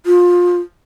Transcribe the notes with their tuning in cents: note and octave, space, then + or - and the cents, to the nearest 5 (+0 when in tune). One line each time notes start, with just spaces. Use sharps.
F4 +20